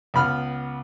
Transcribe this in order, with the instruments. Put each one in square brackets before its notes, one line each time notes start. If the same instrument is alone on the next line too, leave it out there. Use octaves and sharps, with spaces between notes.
[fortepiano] C#2 B3 B5 F6